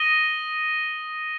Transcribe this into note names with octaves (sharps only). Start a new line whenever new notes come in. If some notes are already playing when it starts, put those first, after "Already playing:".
Already playing: D#6 A#6 D#7 G7